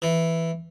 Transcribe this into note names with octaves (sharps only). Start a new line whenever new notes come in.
E3